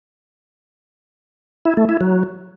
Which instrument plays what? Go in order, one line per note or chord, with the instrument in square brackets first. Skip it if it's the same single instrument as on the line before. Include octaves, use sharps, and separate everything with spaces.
[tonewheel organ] E4
A3
E4
F#3